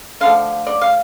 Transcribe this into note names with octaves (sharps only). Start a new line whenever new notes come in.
D3 F3 A3 F5
D5
F5